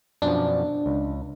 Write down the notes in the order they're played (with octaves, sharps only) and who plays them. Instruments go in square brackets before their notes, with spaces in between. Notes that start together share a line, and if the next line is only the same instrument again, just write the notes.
[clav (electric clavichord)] F#2 B2 F3 [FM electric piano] D4
[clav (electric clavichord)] C#2